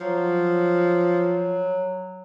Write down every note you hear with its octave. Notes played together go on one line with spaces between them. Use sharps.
F3 F#3